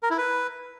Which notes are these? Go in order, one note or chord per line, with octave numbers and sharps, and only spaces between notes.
A#4
E4
B4